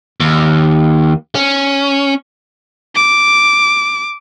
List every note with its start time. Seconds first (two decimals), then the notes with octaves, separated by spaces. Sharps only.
0.20 D#2
1.35 C#4
2.96 D6